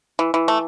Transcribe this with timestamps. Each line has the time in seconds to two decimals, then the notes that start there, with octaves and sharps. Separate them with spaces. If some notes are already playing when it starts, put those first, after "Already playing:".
0.19 E3
0.34 E3
0.48 A3